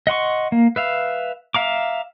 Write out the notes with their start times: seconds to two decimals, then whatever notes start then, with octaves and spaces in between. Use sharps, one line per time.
0.07 D#5 F#5 C6 C#6
0.52 A#3
0.76 B4 E5 F5
1.54 E5 F5 A#5 D6